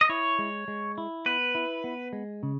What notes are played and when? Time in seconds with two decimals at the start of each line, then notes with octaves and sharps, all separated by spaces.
0.01 D#5
0.09 E4 C#5
0.39 G#3
0.68 G#3
0.98 E4
1.26 B3 B4
1.55 E4
1.84 B3
2.13 G#3
2.43 C#3